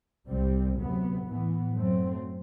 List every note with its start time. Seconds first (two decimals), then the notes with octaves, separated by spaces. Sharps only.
0.28 C2 C3 G3 C4
0.77 D2 C3 F#3 B3
1.26 A2 E3 B3
1.75 F#2 F#3 A3 C4